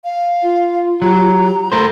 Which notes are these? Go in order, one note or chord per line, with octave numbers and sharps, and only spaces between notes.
F5
F4
F#3 G4 A#5
A3 A4 A#4 C5